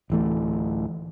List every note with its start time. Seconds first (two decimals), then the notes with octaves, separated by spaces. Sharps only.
0.10 D1 E3 A3